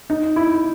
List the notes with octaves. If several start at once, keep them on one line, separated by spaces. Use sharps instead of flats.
D#4
E4